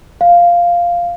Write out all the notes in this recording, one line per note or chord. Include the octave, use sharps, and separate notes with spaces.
F5